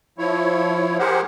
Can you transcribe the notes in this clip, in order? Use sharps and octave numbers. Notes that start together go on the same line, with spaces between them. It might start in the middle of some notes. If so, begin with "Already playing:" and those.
F3 E4 C#5
G4 G#4 A#4 C5 F#5